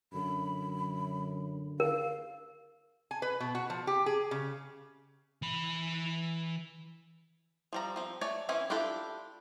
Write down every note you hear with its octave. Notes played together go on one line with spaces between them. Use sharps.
F#2 D3 B5
A#4 F5
G#5
B4
B2
F#4
F3
G4
G#4
C#3
E3 B5
F3 G3 A#5
F3 C4
A3 C#5 D5 G#5
E3 C4 C#4 E4
D4 E4 F4 G4 A4